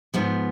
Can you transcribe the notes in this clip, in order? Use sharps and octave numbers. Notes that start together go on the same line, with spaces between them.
G#2 F3 B3